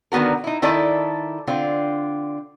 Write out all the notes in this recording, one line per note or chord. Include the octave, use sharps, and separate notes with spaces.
D3 D#3 B3 F#4 A#4
D#4 E4
D#3 E4 A4 D5 D#5
D3 C4 F4